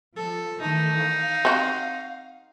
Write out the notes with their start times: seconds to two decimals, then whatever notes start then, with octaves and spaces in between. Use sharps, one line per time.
0.17 F3 A4
0.61 D#3 E3 A3 D#4
1.01 F5
1.45 C4 F#4